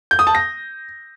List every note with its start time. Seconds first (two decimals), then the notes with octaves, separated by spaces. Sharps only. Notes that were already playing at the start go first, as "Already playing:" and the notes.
0.11 G6
0.19 D#6
0.27 A5
0.35 A#6